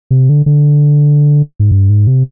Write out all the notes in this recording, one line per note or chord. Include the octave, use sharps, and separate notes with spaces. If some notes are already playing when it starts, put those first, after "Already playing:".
C3
D3
D3
G#2
G2
G#2
C3